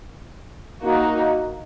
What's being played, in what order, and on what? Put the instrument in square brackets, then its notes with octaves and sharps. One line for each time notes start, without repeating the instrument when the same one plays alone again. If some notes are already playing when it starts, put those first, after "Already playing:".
[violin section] A#3 D#4 F#4